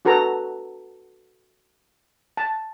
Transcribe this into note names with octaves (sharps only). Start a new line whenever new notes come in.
D4 F#4 A4 B4 A#5
A5